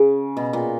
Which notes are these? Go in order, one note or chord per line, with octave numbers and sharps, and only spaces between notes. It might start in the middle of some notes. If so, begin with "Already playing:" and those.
Already playing: C#3
B2
A#2